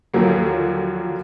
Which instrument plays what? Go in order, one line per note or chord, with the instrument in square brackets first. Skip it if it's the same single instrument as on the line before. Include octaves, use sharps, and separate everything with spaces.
[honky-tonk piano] D#2 D3 F3 F#3 A#3